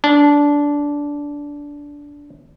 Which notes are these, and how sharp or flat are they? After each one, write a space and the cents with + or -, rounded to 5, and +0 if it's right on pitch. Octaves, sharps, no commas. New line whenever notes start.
D4 -15